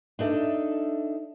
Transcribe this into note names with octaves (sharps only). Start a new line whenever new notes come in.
D4 D#4 A4 E5